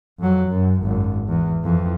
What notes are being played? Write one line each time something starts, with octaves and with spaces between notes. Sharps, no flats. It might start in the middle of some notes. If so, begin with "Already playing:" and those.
F2 F#3
F#2
G#1 F#2
E2 E3
F2 E3